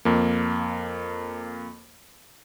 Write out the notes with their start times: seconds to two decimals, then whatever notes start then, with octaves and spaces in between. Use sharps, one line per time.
0.05 F2 A#3